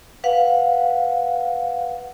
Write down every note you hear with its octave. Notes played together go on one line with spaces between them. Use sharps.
B4 F5 F#5